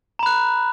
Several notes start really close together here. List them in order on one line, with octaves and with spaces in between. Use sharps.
A#5 B5 F#6